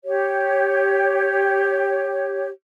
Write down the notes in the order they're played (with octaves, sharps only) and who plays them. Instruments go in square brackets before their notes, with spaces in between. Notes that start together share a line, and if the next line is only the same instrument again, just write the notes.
[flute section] G4 C#5